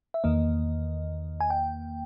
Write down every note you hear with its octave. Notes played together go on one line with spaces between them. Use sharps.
E5
E2 D#3 A#3 D#5
G#5
G5